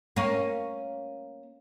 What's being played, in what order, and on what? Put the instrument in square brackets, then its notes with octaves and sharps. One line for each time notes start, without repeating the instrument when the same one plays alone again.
[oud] A#3 C#4